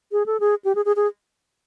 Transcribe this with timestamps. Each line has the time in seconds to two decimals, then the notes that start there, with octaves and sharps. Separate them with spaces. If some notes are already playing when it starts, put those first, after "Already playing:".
0.12 G#4
0.26 A4
0.40 G#4
0.65 G4
0.75 G#4
0.85 G#4
0.96 G#4